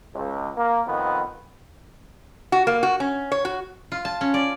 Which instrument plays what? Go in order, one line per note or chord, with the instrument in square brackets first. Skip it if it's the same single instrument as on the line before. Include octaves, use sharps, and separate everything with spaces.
[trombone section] C#2
A#3
F2 D#3 B3
[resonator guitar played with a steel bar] F#4
A#3
F#4
C#4
C#5
F#4
[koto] F4
A5
C#4
D5